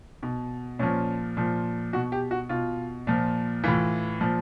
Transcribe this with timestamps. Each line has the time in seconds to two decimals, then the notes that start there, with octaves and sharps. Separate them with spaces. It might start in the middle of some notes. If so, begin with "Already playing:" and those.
0.23 B2
0.79 A#2 F3 C#4
1.37 A#2 F3
1.93 B2 F#4
2.12 G4
2.31 F#4
2.49 B2 F4
3.07 A#2 F3
3.63 A2 E3 F4
4.21 A#2 F3